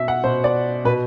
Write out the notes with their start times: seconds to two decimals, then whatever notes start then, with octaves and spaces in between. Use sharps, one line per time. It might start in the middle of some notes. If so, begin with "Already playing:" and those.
Already playing: B2 E5
0.08 F#5
0.24 B2 C5
0.44 D5
0.85 B2 B4